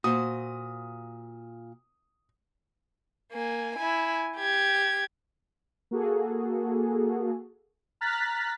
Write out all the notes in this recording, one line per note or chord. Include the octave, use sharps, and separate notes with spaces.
A#2 F#4 C5 D#6
A#3 G#5
E4 G#5
G4 G#6
A#3 F#4 G#4 A4
A#5 F6 F#6 A6 B6